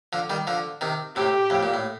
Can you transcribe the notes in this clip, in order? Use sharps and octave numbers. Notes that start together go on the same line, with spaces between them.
D3 F3
D#3 G3
D3 F3
C3 D#3
A2 C3 G4
F2 A2
A#2
A2